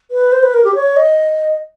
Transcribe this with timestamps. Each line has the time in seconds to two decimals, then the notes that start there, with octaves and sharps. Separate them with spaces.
0.11 B4
0.32 C5
0.43 B4
0.54 A#4
0.64 G4
0.75 C#5
0.97 D#5